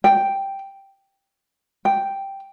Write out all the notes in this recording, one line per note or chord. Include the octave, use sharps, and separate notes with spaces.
G5
G5